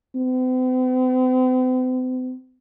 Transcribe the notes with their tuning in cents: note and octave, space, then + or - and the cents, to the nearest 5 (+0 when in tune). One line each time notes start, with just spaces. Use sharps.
C4 -45